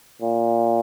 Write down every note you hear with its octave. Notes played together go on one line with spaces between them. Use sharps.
A#2